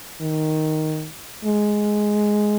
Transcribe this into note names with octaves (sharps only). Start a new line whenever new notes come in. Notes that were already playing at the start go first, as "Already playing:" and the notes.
D#3
G#3